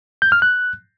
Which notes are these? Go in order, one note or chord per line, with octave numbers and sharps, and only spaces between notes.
G6
F6
F#6